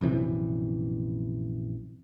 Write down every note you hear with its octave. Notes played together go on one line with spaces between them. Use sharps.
A#1 F#2 C3 E3